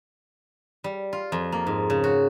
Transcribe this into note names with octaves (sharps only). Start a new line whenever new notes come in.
G3
F4
F2
A#3
G#2
C#3
F#4